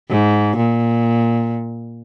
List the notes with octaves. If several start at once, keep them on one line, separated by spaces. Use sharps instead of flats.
G#2
A#2